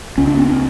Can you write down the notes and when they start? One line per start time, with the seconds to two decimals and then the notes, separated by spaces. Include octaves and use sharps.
0.18 C#2 C#4
0.27 D4
0.37 B3 C#4
0.48 C4 D4